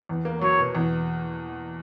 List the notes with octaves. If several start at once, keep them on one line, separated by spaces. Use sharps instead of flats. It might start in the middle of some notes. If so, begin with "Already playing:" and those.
E2
A#3
F#3 C#5
B2
E2